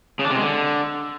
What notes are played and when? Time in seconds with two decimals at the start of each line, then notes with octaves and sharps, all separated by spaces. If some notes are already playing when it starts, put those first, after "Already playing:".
0.19 C#3
0.25 D4
0.30 C3
0.36 G#3
0.41 D3